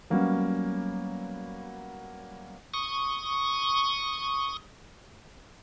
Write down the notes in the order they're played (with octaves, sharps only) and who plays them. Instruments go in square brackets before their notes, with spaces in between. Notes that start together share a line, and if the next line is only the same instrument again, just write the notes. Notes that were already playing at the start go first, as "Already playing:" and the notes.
[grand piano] F#3 G3 A#3 B3 C#4 F#4
[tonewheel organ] C#6 D#6